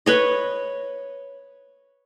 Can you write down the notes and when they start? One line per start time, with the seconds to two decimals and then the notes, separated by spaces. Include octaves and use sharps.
0.06 B4 C#5 D#5